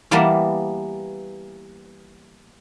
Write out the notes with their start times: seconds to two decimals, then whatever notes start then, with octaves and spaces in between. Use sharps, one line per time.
0.11 E3 G3 A#3 B3 A5 A#5